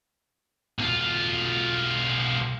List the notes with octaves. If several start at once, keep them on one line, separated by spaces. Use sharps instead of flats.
B1 F4